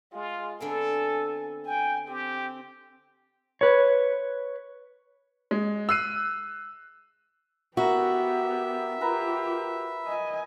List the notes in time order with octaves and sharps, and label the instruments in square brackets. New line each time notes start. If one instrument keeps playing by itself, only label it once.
[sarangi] G#3 [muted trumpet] F4
[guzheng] D3 B3 C4 [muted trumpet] A4 [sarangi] G#5
[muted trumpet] G5 [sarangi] G#5
[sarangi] C4 [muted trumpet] G4
[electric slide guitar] B4 C#5
[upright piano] G#3
E6 F#6 C7 D#7
[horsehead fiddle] B3 G4 [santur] E4 A#4 [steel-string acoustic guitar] F#4 [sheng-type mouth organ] E5
[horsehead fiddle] F4 G4 [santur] A#4 B4 A#5
[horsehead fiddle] D#5 G#5